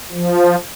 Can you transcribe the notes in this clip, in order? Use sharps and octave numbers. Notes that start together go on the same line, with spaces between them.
F3